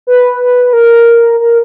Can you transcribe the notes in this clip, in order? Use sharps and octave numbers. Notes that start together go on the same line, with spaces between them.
B4
A#4
A#4